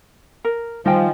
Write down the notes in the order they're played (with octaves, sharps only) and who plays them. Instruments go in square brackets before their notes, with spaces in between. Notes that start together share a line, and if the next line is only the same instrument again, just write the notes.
[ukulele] A#4
[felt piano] D#3 F4 [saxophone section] F3 [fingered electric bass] G3 [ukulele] D#5 G5 G#5